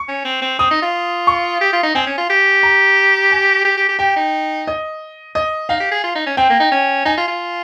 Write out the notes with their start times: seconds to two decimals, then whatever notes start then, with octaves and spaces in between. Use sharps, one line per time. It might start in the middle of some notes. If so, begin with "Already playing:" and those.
Already playing: C#6
0.08 C#4
0.25 C4
0.42 C4
0.59 C4 D#6
0.71 D#4
0.82 F4
1.27 C#6
1.61 G4
1.73 F4
1.83 D#4
1.95 C4 G#5
2.06 C#4
2.18 F4
2.30 G4
2.63 A#5
3.31 G#5
3.65 G4
3.77 G4
3.89 G4
3.99 G4 G5
4.16 D#4
4.67 D#5
5.35 D#5
5.69 D#4 F5
5.80 G4
5.92 G#4
6.04 F4
6.15 D#4
6.26 C#4
6.37 C4 G5
6.49 A#3
6.60 D#4
6.72 C#4
7.05 D#4 G#5
7.17 F4
7.28 F4